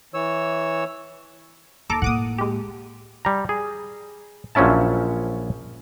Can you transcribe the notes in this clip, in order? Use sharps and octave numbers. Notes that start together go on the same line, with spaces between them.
E3 C#5 E6
D#2 A4 A#5 D6
A2 A#3 F#5 D6 D#6
G#3 G4
G3 A#5
G#4
A#1 F3 F#3 C#4 E4 A5